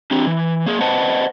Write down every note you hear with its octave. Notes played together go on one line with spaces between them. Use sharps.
C4 D4 G4
E3
A#3 G#4
B4 C5 D#5 F#5 A5